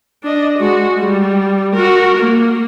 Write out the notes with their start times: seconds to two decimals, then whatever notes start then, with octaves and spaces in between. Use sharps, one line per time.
0.23 D4 D#5
0.59 G#3 F#4
0.99 G3
1.74 F#4 A#4
2.18 A#3